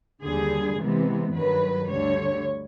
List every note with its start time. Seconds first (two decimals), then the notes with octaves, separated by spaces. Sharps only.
0.23 D#2 D3 G3 G#4
0.79 C3 E3 G#3 B3
1.33 G2 D#3 F#3 B4
1.89 D2 D3 G3 C#5